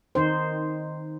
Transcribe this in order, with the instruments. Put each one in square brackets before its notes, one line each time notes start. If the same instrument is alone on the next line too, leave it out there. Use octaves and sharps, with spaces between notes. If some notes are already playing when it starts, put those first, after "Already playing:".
[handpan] D#3 D#4 C5